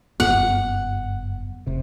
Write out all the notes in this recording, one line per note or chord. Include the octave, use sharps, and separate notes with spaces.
F#1 G2 B3 F#5
F1 C3